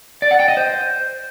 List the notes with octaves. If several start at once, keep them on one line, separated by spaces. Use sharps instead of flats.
D5
F#5
G5
D#5
C5